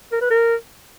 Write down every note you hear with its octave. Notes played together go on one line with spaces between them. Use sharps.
A#4
B4
A#4